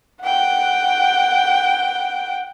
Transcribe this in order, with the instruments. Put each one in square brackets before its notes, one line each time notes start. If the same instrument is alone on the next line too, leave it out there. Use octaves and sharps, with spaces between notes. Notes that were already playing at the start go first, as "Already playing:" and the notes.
[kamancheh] F#5 G5